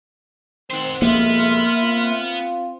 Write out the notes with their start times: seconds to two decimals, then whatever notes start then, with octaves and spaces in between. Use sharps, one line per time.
0.71 D#3 C4 C5 F#5
1.02 F2 B2 G#3 A#3 B3 E5 C6 F6
1.82 C4 F4